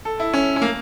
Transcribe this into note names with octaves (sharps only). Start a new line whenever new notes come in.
A4
E4
C#4
C#4
A#3